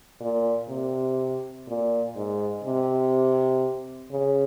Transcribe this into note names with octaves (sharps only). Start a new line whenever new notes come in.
A#2
C3
A#2
G#2
C3
C#3